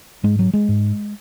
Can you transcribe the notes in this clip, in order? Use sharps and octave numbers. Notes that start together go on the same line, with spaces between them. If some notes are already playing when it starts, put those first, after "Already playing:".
G#2 G#3
F#3
G#3
G#2